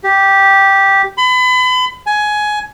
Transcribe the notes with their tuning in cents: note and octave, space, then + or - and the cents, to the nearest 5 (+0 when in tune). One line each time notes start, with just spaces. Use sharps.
G4 -5
B5 +35
G#5 +15